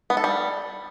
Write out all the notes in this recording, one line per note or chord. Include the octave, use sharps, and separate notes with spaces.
B3
A4
G3